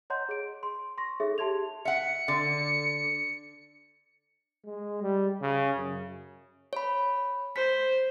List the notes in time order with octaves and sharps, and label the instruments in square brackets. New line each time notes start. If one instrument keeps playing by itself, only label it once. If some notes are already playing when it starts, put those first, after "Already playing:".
[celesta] C#5 D#5 F#5 A#5 C6 G6
G#4 D7
C6
C6 C#6 A#6
D#4 G#4 A4 C#5 E5
G4 A5 C6 G#6 F7
[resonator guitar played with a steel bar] E5 F#5 [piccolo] C#7
[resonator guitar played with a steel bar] D3
[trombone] G#3
G3
C#3
F#2
[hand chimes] C#5 B5
[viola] C5 [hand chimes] B6